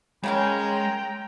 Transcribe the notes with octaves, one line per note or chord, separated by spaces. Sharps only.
C#3 G#3 A#3 C#4 G5 A#5